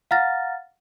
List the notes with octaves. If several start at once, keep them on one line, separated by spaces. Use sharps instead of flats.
F5 F#5 A#5 F6 A6 A#6